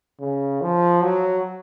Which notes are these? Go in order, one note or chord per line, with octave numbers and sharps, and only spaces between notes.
C#3
F3
F#3